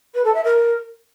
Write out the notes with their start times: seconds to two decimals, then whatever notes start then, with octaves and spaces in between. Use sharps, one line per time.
0.14 B4
0.24 A4
0.34 E5
0.44 A#4